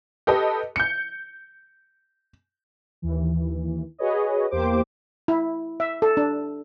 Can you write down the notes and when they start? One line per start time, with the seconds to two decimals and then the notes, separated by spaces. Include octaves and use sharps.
0.27 G4 A4 B4 D#5
0.76 G6 C#7
3.02 D#2 E3
3.98 F#4 G#4 B4 C#5 D#5
4.51 E2 A#3 G4 C5 D6
5.28 E4
5.80 E5
6.02 A4
6.17 D4